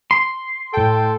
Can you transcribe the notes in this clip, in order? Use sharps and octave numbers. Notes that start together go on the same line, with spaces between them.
C6
A2 A4 G5